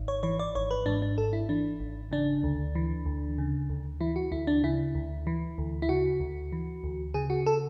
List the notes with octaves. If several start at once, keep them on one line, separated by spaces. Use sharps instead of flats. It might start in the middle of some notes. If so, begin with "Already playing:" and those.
Already playing: G#1
C#5
E3 C#5
D5
G#1 C#5
B4
G#2 D4
D4
G#1 A4
E4
E3 D4
G#1
C#3 D4
D2
E3
D2
C#3
D2
E3 E4
F#4
D2 E4
D4
C#3 E4
D2
E3
D2
E4
C#3 F#4
D2
E3
D2
C#3 G#4
F#4
A4